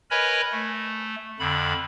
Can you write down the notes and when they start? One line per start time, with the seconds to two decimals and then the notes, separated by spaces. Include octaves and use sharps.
0.11 A#4 B4 C#5 D#5 G#5 B5
0.52 A3
1.39 F2 D3 B5